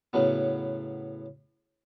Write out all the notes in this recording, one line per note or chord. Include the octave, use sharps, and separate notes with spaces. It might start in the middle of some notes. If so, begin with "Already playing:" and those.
A2 C#3 F#3 B3